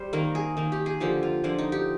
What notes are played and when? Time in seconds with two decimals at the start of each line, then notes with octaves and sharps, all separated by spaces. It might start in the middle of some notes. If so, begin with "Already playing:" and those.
Already playing: G3 C5
0.13 D#3 A#3 A#4
0.35 G#4
0.57 D#3 A#3
0.72 G4
0.86 G#4
1.00 D3 F3 A#3 G4
1.23 F4
1.44 D3 F3 A#3 D4
1.59 D#4
1.72 G4